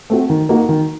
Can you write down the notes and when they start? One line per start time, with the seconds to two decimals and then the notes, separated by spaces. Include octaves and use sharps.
0.10 A3 C4 F#4
0.30 D#3
0.49 A#3 D#4 F#4
0.69 D#3